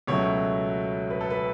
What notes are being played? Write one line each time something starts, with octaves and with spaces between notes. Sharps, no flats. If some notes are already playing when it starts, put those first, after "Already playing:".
C#2 B2 F#3 A3 C#5
B4
A4
B4